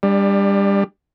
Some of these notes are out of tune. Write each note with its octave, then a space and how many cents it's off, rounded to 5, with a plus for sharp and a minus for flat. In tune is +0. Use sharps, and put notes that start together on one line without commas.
G3 +25 D4 +0